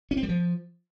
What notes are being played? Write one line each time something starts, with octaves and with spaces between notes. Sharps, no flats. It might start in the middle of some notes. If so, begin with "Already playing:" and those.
C#4
C4
G3
F3